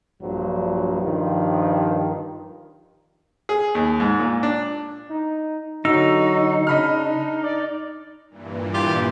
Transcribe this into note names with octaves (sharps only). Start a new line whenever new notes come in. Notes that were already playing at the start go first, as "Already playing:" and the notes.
A#1 G2 F3 F#3
G2 D#3 F3
G#4
D#2
G#2
A#2
D4
D#4
D3 F#3 D#4 F#4 E6
C#3 D4 D#5 B5 F6
D5
G2 A#2 E3
F4 G4 G5